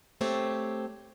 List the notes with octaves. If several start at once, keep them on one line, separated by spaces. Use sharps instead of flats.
A3 C4 G4 C#5